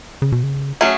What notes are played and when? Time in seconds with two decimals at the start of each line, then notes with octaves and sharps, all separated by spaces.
0.22 C#3
0.32 B2
0.43 C#3
0.81 F#3 A3 C#4 G#4